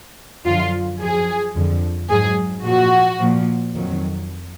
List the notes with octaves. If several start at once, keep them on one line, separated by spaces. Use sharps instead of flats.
F#2 D3 F3 F4
F#2 F3 G#4
F2 D3 F3
G#2 F#3 G#4
A#2 F3 F#4
A#2 F3
F2 D#3 F#3